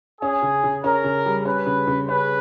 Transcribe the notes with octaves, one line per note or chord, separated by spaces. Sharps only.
C#4 G#4
C#3
C#3
C#4 A#4
C#3
G3
C#4 B4
C#3
C#3
C#4 B4